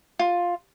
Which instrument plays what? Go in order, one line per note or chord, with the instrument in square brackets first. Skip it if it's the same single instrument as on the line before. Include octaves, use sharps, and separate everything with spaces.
[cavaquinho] F4